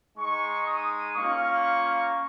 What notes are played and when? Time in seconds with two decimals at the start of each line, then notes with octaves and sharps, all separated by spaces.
0.17 G#3 D#4 C#6
0.67 D#6
1.16 A#3 C#4 F4 C#6